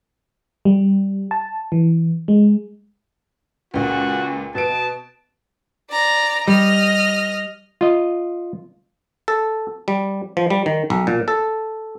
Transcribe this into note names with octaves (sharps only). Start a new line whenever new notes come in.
G3
A5
E3
G#3
C#2 A#2 F#4
B2 B3 A5 D7
D5 A#5
G3 D#5 F6
F4 D#5
A4
G3
F3
G3
D#3
B1
A#2
A4